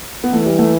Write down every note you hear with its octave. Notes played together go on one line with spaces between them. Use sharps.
B3
E3 A3
G3
A3